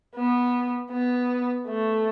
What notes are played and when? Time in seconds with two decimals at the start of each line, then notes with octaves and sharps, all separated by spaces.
0.16 B3
0.92 B3
1.68 A3